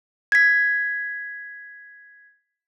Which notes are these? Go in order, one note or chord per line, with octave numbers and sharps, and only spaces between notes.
G#6 B6